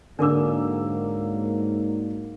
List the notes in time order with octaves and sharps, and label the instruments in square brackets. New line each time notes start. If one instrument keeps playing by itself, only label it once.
[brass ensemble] G#2 F#3 A#3 [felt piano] D3 E6 [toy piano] D4 A#4 D6